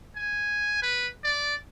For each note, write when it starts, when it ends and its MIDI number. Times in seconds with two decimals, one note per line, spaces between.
0.16 0.81 80
0.82 1.08 71
1.24 1.55 74